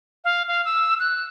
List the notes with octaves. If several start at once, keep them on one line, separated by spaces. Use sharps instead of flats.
F5
F5
E6
F#6